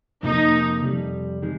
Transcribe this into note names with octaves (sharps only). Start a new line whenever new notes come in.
F2 C3 F3 A#3 D#4
F2 C3 G3
D#3 G#3